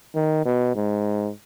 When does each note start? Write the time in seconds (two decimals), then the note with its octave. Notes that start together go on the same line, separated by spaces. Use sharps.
0.15 D#3
0.45 B2
0.75 G#2